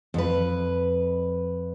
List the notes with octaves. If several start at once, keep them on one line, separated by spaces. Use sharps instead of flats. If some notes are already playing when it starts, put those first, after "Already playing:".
F2 B4